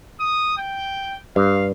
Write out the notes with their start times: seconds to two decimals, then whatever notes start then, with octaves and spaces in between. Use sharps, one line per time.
0.20 D#6
0.58 G5
1.36 G2 F5